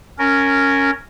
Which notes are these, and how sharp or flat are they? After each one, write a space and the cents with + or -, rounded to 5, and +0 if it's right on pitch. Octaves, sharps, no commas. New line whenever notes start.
C#4 +0 A#4 -10